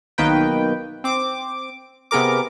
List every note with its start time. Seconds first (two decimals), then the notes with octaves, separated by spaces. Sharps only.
0.18 B1 B2 D#3 A#3 B4 G5
1.04 C4 D6
2.11 C3 B3 G#4 A#4 D6